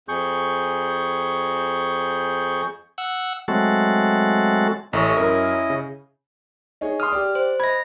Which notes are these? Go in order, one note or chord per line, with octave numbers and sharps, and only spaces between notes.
F2 G#4 C#6 G6
F#5 E6
F#3 G#3 A3 C4 F#4 A4
A1 C#4 E4 A4 D#5 C#6
F#2 A#4
C#3
D#4 G#4 C#5
C6 D#6 F6
G4 D5
C5
D#5 B5 G#6 A#6